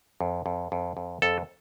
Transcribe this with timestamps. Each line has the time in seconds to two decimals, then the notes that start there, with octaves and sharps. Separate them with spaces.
0.21 F2
0.46 F2
0.72 F2
0.97 F2
1.22 F2 A4